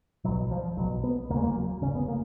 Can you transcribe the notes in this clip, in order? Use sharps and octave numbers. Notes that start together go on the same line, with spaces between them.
B1 B2 F#3
F3
B1 B2 F#3
B3
F1 D#2 C#3 A#3
G#3
A#3
F#3
F1 D#2 C#3 C#4
B3
A#3